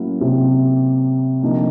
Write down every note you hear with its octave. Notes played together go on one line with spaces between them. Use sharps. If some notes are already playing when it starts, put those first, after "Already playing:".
Already playing: A2 F#3 A#3 C#4 E4
C3
D3 F3 A#3 D#4 G4